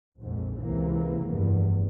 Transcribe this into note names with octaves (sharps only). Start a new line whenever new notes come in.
A#1 F2 G#2
C#2 C3 E3 A#3
F1 E2 G2